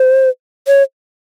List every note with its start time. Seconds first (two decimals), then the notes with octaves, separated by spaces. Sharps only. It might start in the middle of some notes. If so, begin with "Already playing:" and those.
Already playing: C5
0.68 C#5